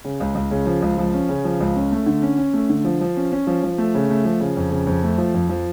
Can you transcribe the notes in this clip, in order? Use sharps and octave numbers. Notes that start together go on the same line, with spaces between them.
C#3
C#2
C#2
C#3
F3
C#2
F3
C#4
C#3
F3
C#2
C#4
A3
D3
C#4
C#4
A3
D3
F3
F3
C#4
C#4
F3
F3
A3
C#3
A3
F3
C#3
F2
C#3
F2
A3
F3
F2
F3